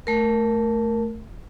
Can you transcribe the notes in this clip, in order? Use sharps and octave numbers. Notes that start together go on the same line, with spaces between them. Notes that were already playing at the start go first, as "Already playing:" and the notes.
A3 A#4